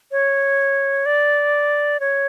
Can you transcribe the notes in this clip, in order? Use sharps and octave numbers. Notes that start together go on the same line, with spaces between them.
C#5
D5
C#5